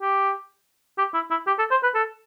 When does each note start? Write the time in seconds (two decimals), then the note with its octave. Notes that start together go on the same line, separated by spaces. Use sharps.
0.01 G4
0.98 G4
1.14 E4
1.30 E4
1.47 G4
1.58 A4
1.71 C5
1.83 B4
1.95 A4